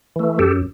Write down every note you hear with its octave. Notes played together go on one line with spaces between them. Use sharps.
E3 A3
F#2 G4 A4